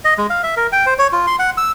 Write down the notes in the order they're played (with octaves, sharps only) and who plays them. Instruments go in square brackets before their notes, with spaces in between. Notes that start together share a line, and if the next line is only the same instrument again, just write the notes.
[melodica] D#5
G#3
F5
E5
A#4
G5
C5
C#5
F4
C6
F#5
E6